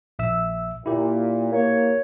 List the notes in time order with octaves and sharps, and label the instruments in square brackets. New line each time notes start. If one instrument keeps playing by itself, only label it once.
[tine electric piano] A#1 E5 E6
[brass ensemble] A#2 [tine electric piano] E4 G4
[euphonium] A#3 [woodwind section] C#5